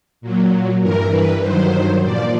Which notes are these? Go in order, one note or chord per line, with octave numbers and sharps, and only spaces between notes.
A#2 F#3
G2 E3 A#4
B4
G2 D#3 F#3 C5
A#2 F3 D5